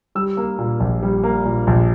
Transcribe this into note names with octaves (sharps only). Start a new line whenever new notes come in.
G3 E6
A#3
A#2
A#1
G3
A#3
A#2
A#1